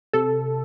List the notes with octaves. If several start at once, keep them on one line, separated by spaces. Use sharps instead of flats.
C3 A4